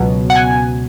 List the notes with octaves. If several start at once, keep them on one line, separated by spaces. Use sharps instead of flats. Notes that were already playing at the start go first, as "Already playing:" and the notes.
Already playing: C#2 B2 F#3
F#5
G#5